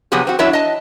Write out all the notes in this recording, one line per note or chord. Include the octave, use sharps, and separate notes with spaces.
C3 F3 F#3 B3 G4 G#4
C4 F#4
E2 F#3 D4 E4 C#5 E5
D#5 A5